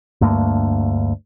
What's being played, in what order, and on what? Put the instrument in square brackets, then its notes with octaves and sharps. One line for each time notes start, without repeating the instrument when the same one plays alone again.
[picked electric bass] D2 G2 A3 A#3